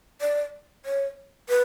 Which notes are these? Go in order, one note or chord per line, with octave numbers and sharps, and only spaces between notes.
D5
C#5
B4